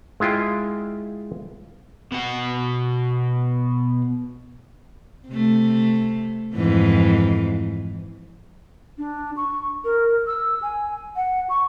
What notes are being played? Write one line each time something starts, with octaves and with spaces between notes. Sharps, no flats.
G#3 E4 F4 G5
B2 F#5
C3 A3
F2 G#2 E3
D4
C#6
A#4
E6
G#5
F#5
C#6